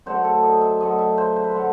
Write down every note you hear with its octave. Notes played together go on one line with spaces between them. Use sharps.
F#2 D3 F#3 A3 C5
A4
D#5
E5
F#2 D3 F#3 A3 D#5
E5
C5
C5
B4
D3 F#3 A3 C5